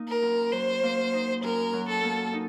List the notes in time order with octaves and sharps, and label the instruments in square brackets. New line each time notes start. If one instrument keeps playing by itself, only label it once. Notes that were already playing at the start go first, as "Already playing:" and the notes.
Already playing: [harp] A#3 D#4
[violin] A#4
[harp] F#2
[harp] F#3 [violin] C5
[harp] A#3
D#4
[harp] F#2 [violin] A#4
[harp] F#3
[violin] A4
[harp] A#3
D#4